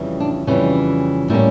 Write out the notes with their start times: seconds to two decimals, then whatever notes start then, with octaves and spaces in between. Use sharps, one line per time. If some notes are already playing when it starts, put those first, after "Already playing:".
Already playing: F2 C#3 E3 G3
0.20 D4
0.47 F2 C#3 E3 G3 C#4
1.29 A2 G3 A#3 C#4 E4